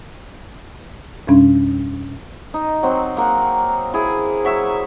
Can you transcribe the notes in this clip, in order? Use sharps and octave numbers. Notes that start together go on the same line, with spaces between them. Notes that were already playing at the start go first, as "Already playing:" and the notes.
F2 B2 G3 C#4 D4
D#4
F#3 C4
A#3 A#4 F#5
E4 G#4
F#3 E5 C#6